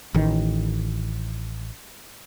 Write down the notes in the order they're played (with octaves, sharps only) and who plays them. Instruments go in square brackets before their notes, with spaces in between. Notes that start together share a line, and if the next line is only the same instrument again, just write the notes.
[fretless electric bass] A1 D#3